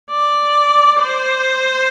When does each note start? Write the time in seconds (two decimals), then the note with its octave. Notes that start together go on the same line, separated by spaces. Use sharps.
0.10 D5
1.00 C5